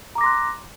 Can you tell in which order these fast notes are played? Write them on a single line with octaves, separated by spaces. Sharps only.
A#5 D6 A#6 C6 F#6